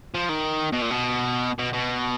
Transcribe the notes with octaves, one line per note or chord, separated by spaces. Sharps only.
F3
D#3
B2
A#2
B2
B2
B2